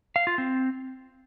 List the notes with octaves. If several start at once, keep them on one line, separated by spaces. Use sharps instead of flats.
F5
F4
C4